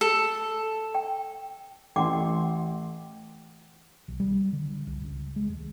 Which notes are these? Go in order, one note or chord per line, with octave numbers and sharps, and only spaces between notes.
A4
G5
A1 F#5 G5 C6 D6
B1
G3
D3
C2
C#2
G#3
D#2